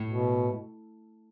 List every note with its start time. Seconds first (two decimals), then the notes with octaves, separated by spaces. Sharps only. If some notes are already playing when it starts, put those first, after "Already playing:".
Already playing: A2
0.08 B2